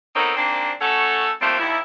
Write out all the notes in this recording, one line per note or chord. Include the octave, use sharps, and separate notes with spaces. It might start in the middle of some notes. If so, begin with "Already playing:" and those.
B3 C4 D#4 A4 A#4 C#5
G#2 A#3 C4 D4
A3 C#4 F#4 A4
F3 G3 A3 A#3 C4 C5
D#2 E4